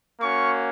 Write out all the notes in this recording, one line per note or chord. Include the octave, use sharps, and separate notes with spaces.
A#3 C#4 F#4 C#6